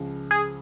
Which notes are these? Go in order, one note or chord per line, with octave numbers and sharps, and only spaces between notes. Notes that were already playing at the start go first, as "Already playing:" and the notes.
Already playing: C#2 C#3 F3
G#4